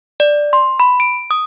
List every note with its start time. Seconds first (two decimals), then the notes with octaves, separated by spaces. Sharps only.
0.20 D5
0.53 C6
0.80 B5
1.00 D7
1.31 D#6